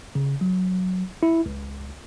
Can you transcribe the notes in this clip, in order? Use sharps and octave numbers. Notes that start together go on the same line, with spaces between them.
C#3
F#3
E4
C#2